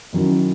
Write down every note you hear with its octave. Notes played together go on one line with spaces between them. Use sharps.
F#2 D#3 F#3 C#4 E4